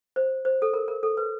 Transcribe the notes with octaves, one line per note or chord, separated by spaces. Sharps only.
C5
C5
A4
A#4
A#4
A4
B4